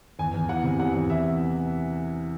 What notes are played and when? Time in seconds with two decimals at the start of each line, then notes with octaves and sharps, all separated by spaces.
0.19 E2 G#5
0.34 E2
0.49 E3 F#5
0.64 C3
0.79 E2 F#5
0.95 E2
1.10 E3 E5